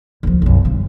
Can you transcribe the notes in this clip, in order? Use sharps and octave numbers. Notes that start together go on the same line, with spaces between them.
D#2 F3
B1 F#2
D3 G3